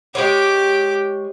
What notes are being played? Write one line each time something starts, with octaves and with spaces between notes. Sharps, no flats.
G#3 G4 C#5 D6